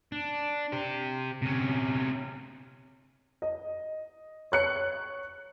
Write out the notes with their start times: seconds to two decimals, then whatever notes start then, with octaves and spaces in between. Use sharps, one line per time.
0.12 D4
0.72 G4 C5
1.42 C3 C#4
3.42 D#5
4.52 C#5 F#6 C#7